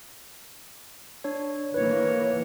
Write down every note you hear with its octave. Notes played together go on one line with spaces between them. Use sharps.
D4 C#5
D#3 E3 A#3 B4 C#5